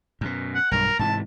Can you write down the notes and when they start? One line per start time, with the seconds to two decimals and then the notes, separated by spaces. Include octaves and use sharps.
0.21 F#2 B2
0.54 F#5
0.71 B1 G2 A#4
0.99 G#2 C3 E3 A5